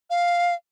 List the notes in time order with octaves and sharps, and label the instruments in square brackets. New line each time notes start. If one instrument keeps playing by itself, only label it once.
[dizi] F5